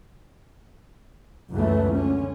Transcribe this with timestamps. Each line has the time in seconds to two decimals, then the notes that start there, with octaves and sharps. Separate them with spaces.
1.52 C#2 F#2 E3 A3
1.94 D3 C#4